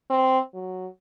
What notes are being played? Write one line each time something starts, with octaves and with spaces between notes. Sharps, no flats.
C4
F#3